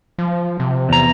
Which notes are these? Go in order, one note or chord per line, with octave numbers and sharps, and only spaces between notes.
F3
C3
E2 A#5